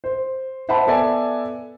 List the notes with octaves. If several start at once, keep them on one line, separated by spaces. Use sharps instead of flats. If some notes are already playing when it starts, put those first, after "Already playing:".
C5
C5 E5 F#5 A5 B5
B3 A4 D5 E5 G#5